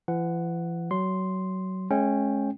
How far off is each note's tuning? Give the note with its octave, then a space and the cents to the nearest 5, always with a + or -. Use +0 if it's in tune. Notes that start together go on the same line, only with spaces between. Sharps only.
E3 +45 F#5 +0
F#3 +20 C6 +0
G#3 +35 C#4 -15 G5 +0